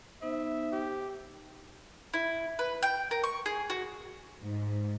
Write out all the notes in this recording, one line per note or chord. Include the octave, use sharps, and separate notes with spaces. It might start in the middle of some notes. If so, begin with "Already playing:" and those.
B3 D#4 C5 E5
G4
E4
B4
G5
A#4
C#6
G#4
F#4
G#2